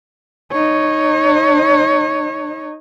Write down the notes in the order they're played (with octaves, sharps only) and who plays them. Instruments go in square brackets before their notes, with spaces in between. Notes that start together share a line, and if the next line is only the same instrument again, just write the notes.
[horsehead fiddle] D#4 C#5